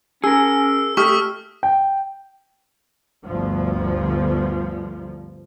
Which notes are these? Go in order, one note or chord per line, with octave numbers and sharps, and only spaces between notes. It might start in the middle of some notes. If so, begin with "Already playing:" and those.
C#4 G#4 A#4 E6
A3 G4 C#6 D#6 F6
G5
G1 D2 F3